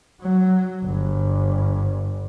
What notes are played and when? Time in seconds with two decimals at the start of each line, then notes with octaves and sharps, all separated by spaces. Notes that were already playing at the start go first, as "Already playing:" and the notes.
0.21 F#3
0.85 G1